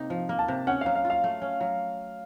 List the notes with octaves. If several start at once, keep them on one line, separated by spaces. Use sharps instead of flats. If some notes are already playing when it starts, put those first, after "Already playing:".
Already playing: C3 A#3 D#4
F3
A#3
A5
C3
C#4 F#5
F#3 F5
F5
F4
F5
A3
C#4
F#3